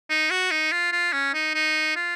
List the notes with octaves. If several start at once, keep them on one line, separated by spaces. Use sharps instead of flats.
D#4
F#4
D#4
F4
F4
C#4
D#4
D#4
F4